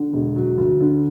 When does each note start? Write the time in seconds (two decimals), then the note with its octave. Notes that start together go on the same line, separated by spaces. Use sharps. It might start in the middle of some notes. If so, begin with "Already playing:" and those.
Already playing: D3
0.13 E1
0.36 F#3
0.58 D2
0.81 D3